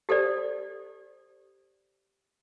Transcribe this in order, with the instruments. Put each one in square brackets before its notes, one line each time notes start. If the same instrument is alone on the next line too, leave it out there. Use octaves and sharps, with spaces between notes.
[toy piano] G4 A4 C5 D5